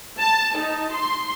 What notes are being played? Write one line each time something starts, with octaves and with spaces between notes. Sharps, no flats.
A5
D#4
C6